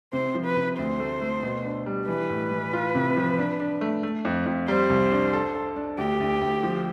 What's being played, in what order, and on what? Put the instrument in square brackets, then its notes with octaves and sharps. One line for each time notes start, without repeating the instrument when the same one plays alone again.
[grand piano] C3 [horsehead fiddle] C5
[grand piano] F3
[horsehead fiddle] B4
[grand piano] C3
[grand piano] D2 [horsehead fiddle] C5
[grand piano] A3
A3
B2
D4
G3
[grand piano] E3 [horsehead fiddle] B4
[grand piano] A2
E3
F4
C3
F3
D4
D4
A3
A3
F2
F2
[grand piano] G3 [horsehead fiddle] C5
[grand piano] C2
D4
A4
A4
D4
[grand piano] D2 [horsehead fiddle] G4
[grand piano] D2
D2
F3